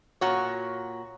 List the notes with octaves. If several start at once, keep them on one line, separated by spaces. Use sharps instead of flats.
A#2 F#4 C#5